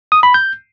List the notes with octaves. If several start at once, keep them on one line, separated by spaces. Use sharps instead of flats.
D#6
B5
G6